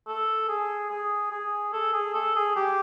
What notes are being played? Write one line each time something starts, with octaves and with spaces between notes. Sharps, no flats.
A4
G#4
G#4
G#4
A4
G#4
A4
G#4
G4